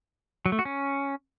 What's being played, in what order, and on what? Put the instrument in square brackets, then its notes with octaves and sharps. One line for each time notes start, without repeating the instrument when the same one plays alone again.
[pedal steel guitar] F#3
A3
F#4
C#4